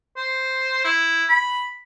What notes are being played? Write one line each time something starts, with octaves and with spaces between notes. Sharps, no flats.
C5
E4
B5